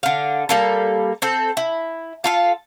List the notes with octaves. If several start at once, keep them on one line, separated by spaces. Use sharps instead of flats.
D3 F5
G3 A#3 A4
C4 A4
E4
F4 A4 F5